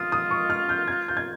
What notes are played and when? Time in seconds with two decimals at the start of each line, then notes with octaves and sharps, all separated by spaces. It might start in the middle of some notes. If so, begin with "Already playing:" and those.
Already playing: F4 D#6
0.12 D#6
0.31 C#6
0.50 F6
0.69 G6
0.88 G#6
1.08 G6
1.17 G#6